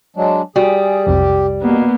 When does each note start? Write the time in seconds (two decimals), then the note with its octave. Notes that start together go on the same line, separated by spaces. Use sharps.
0.17 F#3 G#3 D4
0.56 G3 F#4 G#4
1.07 B1 F2 C3 G4
1.62 B2 A#3 B3